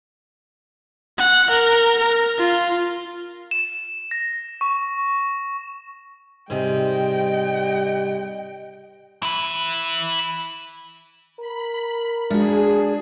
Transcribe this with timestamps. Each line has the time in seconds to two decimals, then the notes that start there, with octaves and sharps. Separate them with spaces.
1.18 F#5
1.50 A#4
1.98 A#4
2.38 F4
3.51 E7
4.11 A#6
4.61 C#6
6.50 G#2 C3 G3 D#5 G5
9.23 E4 B4
11.39 A#4 B5
12.30 G#3 D4 F#4 G#4